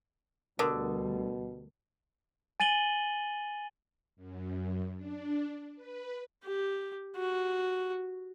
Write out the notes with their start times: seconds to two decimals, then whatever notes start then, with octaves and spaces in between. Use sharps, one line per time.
0.59 D2 B2 D3 G3 F#4 A#4 D#6
2.60 G#5 A6 D#7 F#7 G7
4.16 F#2
4.96 D4
5.75 B4
6.44 G4
7.17 F#4